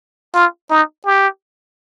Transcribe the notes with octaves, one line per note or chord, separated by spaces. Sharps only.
F4
D#4
G4